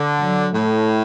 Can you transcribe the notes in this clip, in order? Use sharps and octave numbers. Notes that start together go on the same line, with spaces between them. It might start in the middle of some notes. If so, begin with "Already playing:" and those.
Already playing: D3
F#3
A2 A3